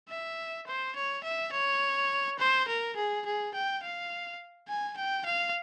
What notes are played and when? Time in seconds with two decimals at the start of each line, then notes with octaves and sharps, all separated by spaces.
0.09 E5
0.67 C5
0.95 C#5
1.24 E5
1.52 C#5
2.39 C5
2.68 A#4
2.96 G#4
3.25 G#4
3.54 G5
3.83 F5
4.68 G#5
4.97 G5
5.25 F5